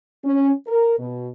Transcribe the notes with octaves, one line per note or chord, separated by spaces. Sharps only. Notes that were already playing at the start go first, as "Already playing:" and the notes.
C#4
A#4
B2